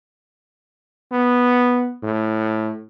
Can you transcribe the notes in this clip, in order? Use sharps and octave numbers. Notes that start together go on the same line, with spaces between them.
B3
A2